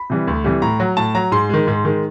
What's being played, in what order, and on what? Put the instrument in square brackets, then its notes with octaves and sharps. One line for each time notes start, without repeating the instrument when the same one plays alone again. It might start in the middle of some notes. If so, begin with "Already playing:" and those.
Already playing: [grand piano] B5
C3 E3 G3
D2
C3 E3 G3
A2 A#5
F#3
A2 A5
F#3 A#5
G#2 C6
D#3 G#3
G#2
D#3 G#3